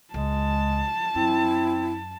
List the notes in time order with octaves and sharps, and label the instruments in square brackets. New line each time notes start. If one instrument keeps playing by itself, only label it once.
[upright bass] C#2 [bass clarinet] G#3 [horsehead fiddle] A5
[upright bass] F#2 [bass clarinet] C4 [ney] E4